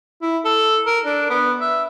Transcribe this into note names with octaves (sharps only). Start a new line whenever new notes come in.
E4
A4
A#4
D4
B3
E5